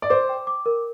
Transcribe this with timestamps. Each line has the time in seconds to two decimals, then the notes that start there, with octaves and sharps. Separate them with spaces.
0.02 D5
0.10 C5 D6
0.29 G5
0.47 D6
0.66 A#4